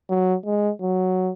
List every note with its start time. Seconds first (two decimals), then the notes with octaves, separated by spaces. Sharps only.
0.10 F#3
0.46 G#3
0.82 F#3